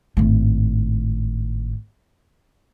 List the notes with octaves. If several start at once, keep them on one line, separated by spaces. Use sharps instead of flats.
G#1 A2